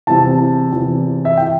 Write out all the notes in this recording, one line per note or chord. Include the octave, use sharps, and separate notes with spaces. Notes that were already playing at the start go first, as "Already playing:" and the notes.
E2 C3 E3 A5
E2 C3 E3
E5
E3 G5